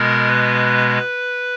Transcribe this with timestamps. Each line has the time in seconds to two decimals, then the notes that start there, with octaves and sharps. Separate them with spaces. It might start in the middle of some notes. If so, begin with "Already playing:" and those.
Already playing: B2 G#3 B3 A#4
0.27 B4